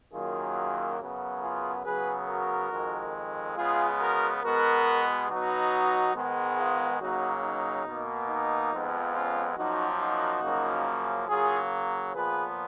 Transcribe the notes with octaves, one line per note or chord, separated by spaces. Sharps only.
F#2 D#3 F#3 A#3 F4 G#4
F#2 C#3 F#3 B3
F4 G#4
C#3 F#3 B3 G#4 B4
F#4 A#4
F2 D#3 G#3
C#3 G#3 B3 F4 G#4
F#4 A#4
B2 G#3 B3 F#4 A#4
B2 F#3 B3 D#4 F#4
G#2 D#3 G#3 B3
F4 G#4
C#3 F#3 A#3 D#4 F#4
D#4
B2 A#3
D#4
F2 F3 G#3 B3
C#4 F4
F#2 F3 A#3 D#4 F#4
D#4 F#4
F#2 C#3 F3 A#3
C#3 F#3 A#3 F4 G#4
A#2 F3 B3 G#4 B4